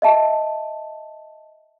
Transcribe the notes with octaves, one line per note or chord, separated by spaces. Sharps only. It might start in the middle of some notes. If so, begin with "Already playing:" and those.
D#5 E5 A5